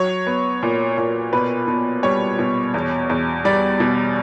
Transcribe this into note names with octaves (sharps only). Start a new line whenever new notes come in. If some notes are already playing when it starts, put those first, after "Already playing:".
Already playing: F#3 C#5
B3
A#2
A#2
B2 B4
B2
G3 C#5
B2
E2
E2
G3 D5
B2